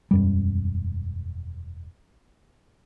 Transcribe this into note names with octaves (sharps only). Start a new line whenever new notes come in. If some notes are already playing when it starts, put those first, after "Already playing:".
E1 F#2 G3